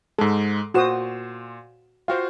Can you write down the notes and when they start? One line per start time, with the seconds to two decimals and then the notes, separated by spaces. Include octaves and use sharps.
0.19 G#2 G#3 A4
0.74 A#2 F#4 C5 C6 D#6 E7
2.08 F4 F#4 C5 F5 G5